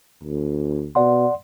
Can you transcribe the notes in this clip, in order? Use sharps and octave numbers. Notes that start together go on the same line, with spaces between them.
D2
B2 D5 F#5 C6